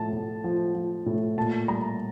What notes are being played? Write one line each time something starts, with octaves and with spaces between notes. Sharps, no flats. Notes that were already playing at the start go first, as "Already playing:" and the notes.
Already playing: A2 F3 A5
A2
F3
F3
A2
A#2 A5
G3 A#5